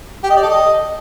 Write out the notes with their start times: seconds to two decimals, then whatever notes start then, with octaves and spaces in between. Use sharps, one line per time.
0.24 G4
0.30 D#5
0.36 D5
0.43 A4
0.49 D#5